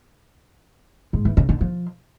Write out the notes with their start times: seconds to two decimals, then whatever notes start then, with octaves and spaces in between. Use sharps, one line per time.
1.13 G#2
1.25 E3
1.37 C#3
1.49 D3
1.61 F3